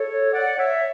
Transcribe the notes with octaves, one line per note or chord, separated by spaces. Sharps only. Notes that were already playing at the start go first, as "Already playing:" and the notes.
Already playing: A4 C#5
D5 F#5
C#5 E5